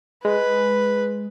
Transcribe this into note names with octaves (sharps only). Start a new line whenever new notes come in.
G#3 B4